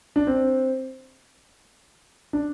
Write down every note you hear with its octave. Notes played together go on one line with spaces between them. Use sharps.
D4
C4
D4